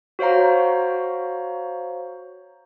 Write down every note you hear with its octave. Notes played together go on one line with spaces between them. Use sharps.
F#4 C5 C#5 F5 A#5